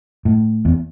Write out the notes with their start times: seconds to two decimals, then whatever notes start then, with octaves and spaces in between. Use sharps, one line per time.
0.25 A2
0.65 E2